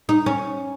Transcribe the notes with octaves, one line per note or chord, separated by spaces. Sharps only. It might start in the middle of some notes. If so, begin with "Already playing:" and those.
D#4
C#4